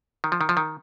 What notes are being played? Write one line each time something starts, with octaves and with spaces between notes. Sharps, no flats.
D#3
F3
D#3
F3
D#3